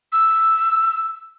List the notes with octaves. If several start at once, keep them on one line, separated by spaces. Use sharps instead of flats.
E6